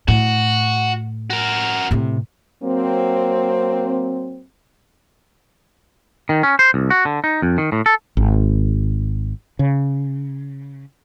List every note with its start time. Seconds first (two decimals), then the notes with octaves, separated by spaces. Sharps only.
0.08 A2 F#4
1.30 F#4 A#4
1.91 A2 C3
2.62 F#3 A#3 C4
6.29 D#3
6.43 C#4
6.59 C5
6.74 C2
6.90 F#4
7.05 D3
7.24 D#4
7.42 F2
7.58 D#3
7.72 A2
7.86 A4
8.17 G#1
9.59 C#3